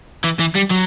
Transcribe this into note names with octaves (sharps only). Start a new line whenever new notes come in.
E3
E3
G3
F#3